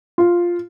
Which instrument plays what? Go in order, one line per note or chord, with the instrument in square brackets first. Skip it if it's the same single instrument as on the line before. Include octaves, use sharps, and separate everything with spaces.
[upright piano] F4